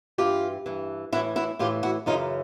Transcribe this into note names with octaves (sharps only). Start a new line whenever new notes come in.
G2 E3 F4 G4
G2 E3
A2 E3 E4 F#4
E4 F#4
A2 E3 F4 G4
E4 F#4
F#2 C#3 E3 D#4 F4